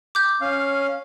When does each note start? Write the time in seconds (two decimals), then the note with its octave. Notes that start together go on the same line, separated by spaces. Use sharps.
0.15 D6 G6
0.41 C#4 F5